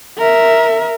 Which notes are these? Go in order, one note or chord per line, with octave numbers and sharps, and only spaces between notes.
A#4 E5